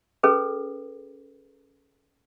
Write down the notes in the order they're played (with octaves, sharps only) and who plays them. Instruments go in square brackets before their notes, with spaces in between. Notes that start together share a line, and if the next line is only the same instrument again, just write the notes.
[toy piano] C#4 G#4 A4 B4